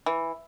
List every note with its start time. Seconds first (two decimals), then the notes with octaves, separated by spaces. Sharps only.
0.06 E3